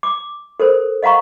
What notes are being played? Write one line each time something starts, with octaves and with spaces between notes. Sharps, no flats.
D6
A4 A#4 C5
D#5 F5 F#5 A#5 C#6